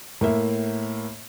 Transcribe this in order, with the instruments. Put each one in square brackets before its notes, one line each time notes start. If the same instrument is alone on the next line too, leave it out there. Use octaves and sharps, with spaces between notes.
[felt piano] A2 A#3 E5